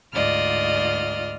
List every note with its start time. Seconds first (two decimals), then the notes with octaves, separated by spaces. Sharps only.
0.14 D2 G#2 F4 D5 D#5 F6